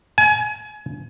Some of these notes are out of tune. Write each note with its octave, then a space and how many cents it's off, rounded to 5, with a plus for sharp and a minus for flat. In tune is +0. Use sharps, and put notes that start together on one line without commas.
G#5 +30